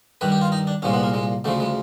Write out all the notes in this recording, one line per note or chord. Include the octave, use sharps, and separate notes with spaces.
G2 D#3 G3 B4
G4
F4
D#4
D4
C2 A#2 F3 G#3 C#4
B3
A#3
G#3
D2 C#3 F3 A3
G#3